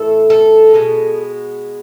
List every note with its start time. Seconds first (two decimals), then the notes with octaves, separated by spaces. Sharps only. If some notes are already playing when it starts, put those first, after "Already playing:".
Already playing: A2 E3 A3 A4
0.30 A4
0.74 B2 G#3 B3